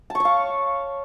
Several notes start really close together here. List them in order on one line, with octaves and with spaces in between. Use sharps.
A5 C#6 C#5 F5